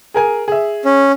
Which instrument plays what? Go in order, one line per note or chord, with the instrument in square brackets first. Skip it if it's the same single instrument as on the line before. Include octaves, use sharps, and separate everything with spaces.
[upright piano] G#4 A#4 G#5
G#4 E5
[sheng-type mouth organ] C#4